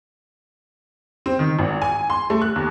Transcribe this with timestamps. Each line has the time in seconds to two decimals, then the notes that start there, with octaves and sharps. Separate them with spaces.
1.26 C4
1.39 D#3
1.59 G#1
1.82 G#5
2.10 C6
2.30 A3
2.42 F#6
2.56 D#2